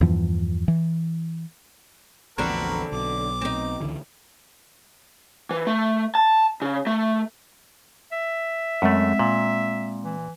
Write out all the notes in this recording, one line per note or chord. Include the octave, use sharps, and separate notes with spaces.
E2 G2 E3 F3
E3
A#1 E2 D3 C4 F#4 A#4 B4
B1 D6
C4 D#4
C#2 D3 E3
E3
A3
A5
C#3
A3
E5
F#2 G#3 A3 C4 F#5
A#2
E3